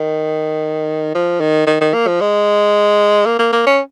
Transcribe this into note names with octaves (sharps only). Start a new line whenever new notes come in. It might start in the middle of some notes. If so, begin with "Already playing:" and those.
Already playing: D#3
F3
D#3
D#3
D#3
A#3
F3
G#3
A#3
A#3
A#3
C#4